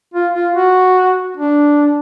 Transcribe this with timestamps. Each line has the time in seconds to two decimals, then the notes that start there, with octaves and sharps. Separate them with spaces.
0.14 F4
0.34 F4
0.55 F#4
1.37 D4